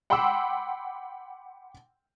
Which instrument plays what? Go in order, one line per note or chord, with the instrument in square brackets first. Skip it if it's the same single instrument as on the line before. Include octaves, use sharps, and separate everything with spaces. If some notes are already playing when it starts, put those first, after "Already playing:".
[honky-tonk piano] F#5 G5 B5 C6 D6 E6